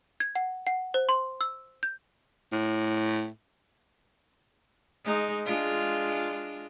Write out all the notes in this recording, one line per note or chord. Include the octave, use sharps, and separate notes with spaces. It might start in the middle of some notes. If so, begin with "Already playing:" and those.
G#6
F#5
F#5
C5
C6
E6
G6
A2
G#3 D#4
G#3 D4 F4